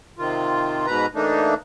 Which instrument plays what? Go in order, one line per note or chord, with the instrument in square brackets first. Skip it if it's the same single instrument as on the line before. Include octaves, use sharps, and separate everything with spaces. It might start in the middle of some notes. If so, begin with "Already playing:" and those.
[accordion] C3 D#3 F4
G#2 B2 B4 A#5
E3 A3 A#3 D4 D#4